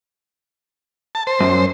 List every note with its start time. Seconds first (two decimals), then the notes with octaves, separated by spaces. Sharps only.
1.15 A5
1.27 C5
1.40 F#2